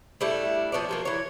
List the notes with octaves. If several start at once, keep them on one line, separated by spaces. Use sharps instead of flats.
G3 A3 D4 E4
F3 B3 C#5 D5
F3 F#3 A#3
E3 C#5